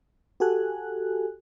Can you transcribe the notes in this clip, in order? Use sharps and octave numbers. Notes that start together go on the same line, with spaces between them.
F#4 G4 A4 G#5 F#6